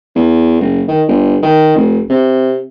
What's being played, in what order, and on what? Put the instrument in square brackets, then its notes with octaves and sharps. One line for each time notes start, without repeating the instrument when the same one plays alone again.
[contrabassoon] E2
F#1
D#3
G1
D#3
F1
C3